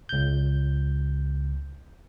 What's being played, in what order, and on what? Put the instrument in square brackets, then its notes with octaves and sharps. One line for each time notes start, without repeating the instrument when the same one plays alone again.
[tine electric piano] C#2 G6